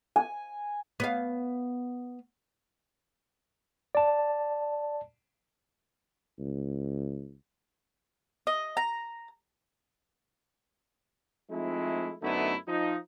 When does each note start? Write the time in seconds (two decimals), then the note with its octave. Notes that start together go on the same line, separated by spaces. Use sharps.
0.16 G#5
1.00 B3 C#5 F5
3.95 D5 A5
6.39 C#2
8.47 D#5
8.77 A#5
11.51 F3 G#3 A3 C4 D#4 E4
12.23 F#2 D3 A3 B3 D#4 E4
12.68 F3 D#4